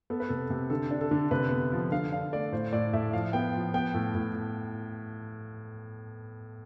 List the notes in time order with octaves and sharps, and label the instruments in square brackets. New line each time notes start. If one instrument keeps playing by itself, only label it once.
[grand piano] B3 A4
B4
C3 A4
C3
D3 A4
D4
A4
D3
C3 B4
B3
F3
D3 F5
D4 F5
A3 D5
A2 C5
A2 D5
A2 E5
F3 F5
B3 G5
F3
B3 G5
A2
A2